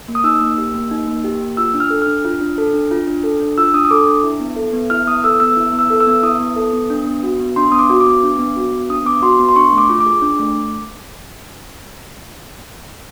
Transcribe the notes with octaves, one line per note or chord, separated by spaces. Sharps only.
A#3
D#6
D#4 E6
A#3
G4
A#3
D#4
A#3
G4
A#3
F4 E6
D4
F6
A4
D4 F6
F4
D4
A4
D4
F4
D4
A4
D4
F4 E6
D4 D#6
D#6
A4 D6
D4
E4
B3
A4
B3
E4 F6
B3 D#6
A4 E6
B3 E6
E4
B3
E6
A4
E6
B3
E4 D#6
B3
A4
B3
D4
B3
F#4
B3
D4 C6
B3 D#6
D6
F#4
D6
B3
D4
B3
F#4
B3
D4 D#6
B3 D6
F#4 C6
B3
C6
D4 C#6
A3
D6
F4
D6
G#4
D4
A3